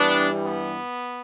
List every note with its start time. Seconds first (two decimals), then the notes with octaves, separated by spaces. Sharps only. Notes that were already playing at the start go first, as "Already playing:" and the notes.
Already playing: G2 E3 G3 B3 D4
0.45 B3